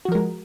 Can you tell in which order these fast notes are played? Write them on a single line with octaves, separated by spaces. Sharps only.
F#4 F3 A#4 G#3